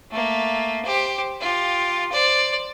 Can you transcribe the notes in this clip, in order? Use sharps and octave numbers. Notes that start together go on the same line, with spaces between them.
A3 A#3
G4 C5
F4 G4
C5 D5